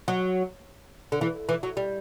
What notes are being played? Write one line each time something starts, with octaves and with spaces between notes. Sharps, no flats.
F#3
D3
E3
E3
F#3
G3